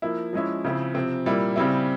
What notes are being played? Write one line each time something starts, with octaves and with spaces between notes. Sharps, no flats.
F3 A#3 E4
F3 G#3 C#4 E4
C#3 F3 C4 E4
C3 F3 C4
A#2 G3 A#3 E4
C#3 G3 C4 E4